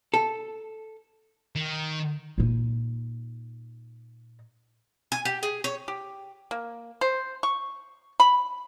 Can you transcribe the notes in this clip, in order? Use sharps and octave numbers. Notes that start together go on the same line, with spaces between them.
A4
D#3
A#2 D#4
G#5
G4
G#4
C#5
G4
A#3
C5
C#6
B5